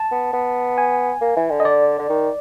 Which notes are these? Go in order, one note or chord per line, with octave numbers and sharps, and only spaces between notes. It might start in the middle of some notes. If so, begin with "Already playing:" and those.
Already playing: A5
B3
B3
G#5
A#3
E3
D3
D#5
D5
D3
D#3